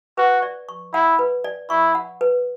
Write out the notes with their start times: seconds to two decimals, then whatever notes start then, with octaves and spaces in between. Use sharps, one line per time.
0.18 F#4 B4
0.42 D5
0.69 C#6
0.94 E4 F#5
1.19 B4
1.44 D5
1.70 E4 C#6
1.95 F#5
2.21 B4